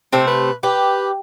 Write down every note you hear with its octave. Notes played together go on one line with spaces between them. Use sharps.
C3 A3 C4 C5
B4
G4 B4